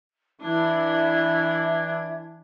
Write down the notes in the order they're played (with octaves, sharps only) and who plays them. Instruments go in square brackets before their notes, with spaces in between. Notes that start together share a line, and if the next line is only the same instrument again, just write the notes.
[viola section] E3 D4 [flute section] E4 E5 G#6